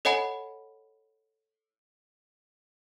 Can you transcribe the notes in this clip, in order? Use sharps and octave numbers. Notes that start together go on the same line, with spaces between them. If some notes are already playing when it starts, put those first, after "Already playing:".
A4 C#5 D#5 F#5 G#5 B5